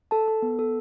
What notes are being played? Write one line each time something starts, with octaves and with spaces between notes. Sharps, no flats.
A4 A5
A4
B3
A4